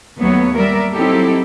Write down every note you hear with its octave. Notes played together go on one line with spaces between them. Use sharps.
D#2 F#3 A3 B3 C#5
G3 A#4 D5 E5
F#3 C4 D#4 E4 G4 A4